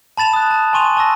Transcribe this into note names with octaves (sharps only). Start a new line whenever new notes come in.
A5 B5 A6 E7 F7
D#6 F#6
A5
G#5 C6 C#6 D#7 F7
A5 C#6 E6 A#6